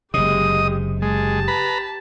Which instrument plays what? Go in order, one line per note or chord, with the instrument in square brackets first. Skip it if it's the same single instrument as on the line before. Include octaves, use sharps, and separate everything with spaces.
[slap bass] F#1 C3 [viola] G#3 G4 [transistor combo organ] D#5 D#6
[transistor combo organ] G#3 [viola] G4 A5
[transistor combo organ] B4 A#5 B5